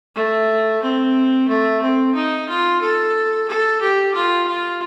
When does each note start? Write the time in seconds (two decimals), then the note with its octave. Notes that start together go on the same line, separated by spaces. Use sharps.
0.15 A3
0.82 C4
1.48 A3
1.81 C4
2.15 D#4
2.49 F4
2.81 A4
3.48 A4
3.81 G4
4.14 F4
4.47 F4